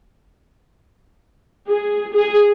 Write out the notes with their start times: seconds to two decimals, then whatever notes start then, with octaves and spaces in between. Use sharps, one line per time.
1.69 G#4
2.15 G#4